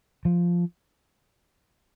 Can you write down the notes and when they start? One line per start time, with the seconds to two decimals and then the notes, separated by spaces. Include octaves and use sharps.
0.25 F3